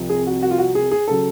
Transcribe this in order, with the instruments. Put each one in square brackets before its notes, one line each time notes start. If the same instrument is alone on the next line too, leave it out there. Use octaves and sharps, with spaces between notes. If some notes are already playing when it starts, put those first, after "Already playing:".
Already playing: [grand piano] C2 C3 F3
G#4
F#4
F#4
F4
F#4
G#4
G#4
C#3 F#3 A4